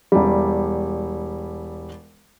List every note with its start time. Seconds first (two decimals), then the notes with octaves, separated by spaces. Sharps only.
0.12 E1 G3